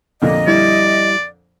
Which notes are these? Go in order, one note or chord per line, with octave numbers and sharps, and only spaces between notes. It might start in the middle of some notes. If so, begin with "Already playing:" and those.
F2 A#2 D3 D#5
G3 E4 D5